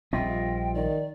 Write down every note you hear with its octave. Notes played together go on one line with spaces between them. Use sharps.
A#1 G3 C4 F4 D#5 E5 G5
D#3 D5